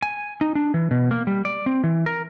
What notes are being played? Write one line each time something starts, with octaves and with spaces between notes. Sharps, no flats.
G#5
D#4
D4
E3
B2
A#3
G3
D5
C4
E3
A#4